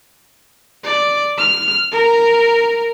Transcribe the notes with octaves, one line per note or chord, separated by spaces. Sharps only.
D5
F6
A#4